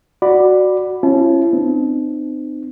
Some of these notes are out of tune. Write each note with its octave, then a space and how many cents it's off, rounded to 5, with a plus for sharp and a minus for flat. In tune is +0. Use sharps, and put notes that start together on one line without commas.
F#4 +0 D5 +10 B5 +0
C#4 -35 E4 +45 A5 -30
C4 -35 D#4 -45